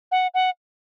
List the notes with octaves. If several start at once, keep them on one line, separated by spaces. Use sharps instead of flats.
F#5
F#5